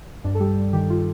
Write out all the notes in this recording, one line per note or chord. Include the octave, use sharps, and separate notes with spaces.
G2 D4
A4
G3 G4
G3
D#3 G4
F4